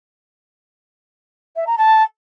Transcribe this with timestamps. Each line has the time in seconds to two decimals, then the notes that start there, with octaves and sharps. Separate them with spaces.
1.56 E5
1.66 A#5
1.77 A5